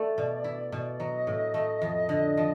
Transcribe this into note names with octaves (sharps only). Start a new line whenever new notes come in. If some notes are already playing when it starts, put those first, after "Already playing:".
Already playing: A3 D5
B2
E4
B2
F#3 D#5
A2
A3
F2
D3
F3